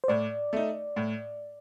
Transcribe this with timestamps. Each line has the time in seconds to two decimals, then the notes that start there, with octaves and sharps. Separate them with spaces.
0.04 C5
0.08 A2 D5
0.53 A3 D#4
0.96 A2